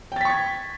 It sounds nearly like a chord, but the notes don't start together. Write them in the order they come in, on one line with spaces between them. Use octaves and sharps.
G5 A6 B6 C#6 G#6